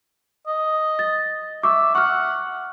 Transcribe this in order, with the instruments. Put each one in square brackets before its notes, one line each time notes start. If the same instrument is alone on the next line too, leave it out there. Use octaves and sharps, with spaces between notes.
[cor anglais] D#5
[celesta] A6
[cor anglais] E5 [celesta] C#6 D6
[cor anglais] F#5 [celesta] C#6 F6